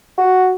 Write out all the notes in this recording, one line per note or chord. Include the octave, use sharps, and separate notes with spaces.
F#4